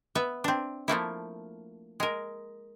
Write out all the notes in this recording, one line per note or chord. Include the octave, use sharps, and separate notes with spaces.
B3 B4 E5
C4 D4
F3 A3 A#3 E4
G#3 A#4